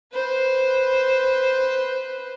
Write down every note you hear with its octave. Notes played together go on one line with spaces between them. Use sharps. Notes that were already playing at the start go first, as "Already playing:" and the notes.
B4 C5